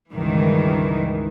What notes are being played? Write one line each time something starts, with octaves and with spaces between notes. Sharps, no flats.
C#2 G2 D#3 E3